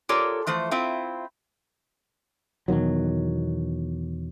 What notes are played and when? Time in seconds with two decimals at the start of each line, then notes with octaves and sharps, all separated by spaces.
0.09 F4 G4 A4 A#4 C#5 D5
0.47 E3 F3 A3 C5
0.71 C4 E4 F4
2.68 E2 B2 D#3 F#3